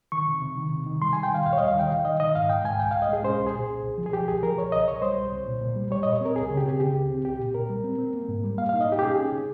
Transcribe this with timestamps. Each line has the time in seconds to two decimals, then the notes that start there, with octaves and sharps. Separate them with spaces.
0.12 D#3 C#6
0.27 C3
0.42 C3
0.58 D#3
0.72 C3
0.86 D#3
1.01 G3 C6
1.13 G3 G#5
1.23 G5
1.31 D#3 F5
1.46 D#2 F5
1.53 C#5
1.58 G3 D#5
1.68 F5
1.76 D#3 G5
1.90 D#3 F5
2.05 D#3 D#5
2.20 D#3 D#5
2.35 G#2 F5
2.49 G#2 G5
2.65 G#2 G#5
2.79 C2 G5
2.91 C2 F5
3.02 D#5
3.09 G#3 G#4
3.23 C#4 C5
3.39 C2
3.46 G#4
3.54 A#2
3.69 C2
3.83 C2
3.98 F3
4.06 G#4
4.13 F3 G4
4.28 C2 G#4
4.43 F3 A#4
4.57 C2 C#5
4.72 C2 D#5
4.87 C2 C#5
5.02 G3 C5
5.18 C2
5.32 C2
5.47 A#2
5.61 A#2
5.76 G3
5.91 G3 C#5
6.03 A#2 D#5
6.13 C#5
6.21 C4 A#4
6.36 C#2 G#4
6.50 C#3
6.57 G4
6.66 C4 G#4
6.80 C#3 G4
6.95 C#2
7.10 C4
7.25 C2 G4
7.39 A#2
7.54 A#2 A#4
7.70 G3
7.84 C4
7.98 C4
8.13 A#3
8.29 G#2
8.44 G3
8.58 A#3 F5
8.69 D#4 F5
8.81 D#5
8.89 D#4 G4
8.99 G4
9.02 C#4 G#4
9.17 C#4
9.32 C3